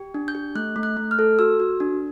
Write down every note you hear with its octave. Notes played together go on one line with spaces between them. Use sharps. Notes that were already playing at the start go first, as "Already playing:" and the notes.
Already playing: G4
D4
G6
G4
A3 F#6
A3
F#6
A3
F6
A4
F#4 E6
F#4
D4